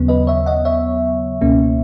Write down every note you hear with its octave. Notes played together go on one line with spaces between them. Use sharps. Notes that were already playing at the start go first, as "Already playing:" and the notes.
Already playing: D#2 C#3 F#3 B3
B4 D#5
C#5 E5
D#5 F#5
C#5 E5
C#2 B2 A#3 C#4